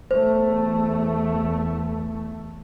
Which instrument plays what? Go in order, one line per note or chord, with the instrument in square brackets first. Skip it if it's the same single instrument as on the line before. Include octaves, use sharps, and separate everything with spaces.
[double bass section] E2 A3 [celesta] C5